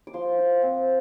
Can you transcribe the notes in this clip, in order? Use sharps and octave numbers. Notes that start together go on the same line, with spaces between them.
D6
F3 C6
F4
C4